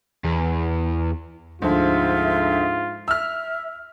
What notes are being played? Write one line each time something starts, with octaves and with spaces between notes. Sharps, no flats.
E2
D2 G#2 F3 F4 E5
E5 E6 F6